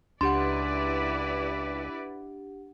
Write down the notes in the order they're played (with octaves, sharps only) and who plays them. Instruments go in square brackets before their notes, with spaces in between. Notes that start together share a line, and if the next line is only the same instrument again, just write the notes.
[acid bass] C#2 [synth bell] D4 G4 F#5 [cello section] E4 B4 D5 [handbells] C6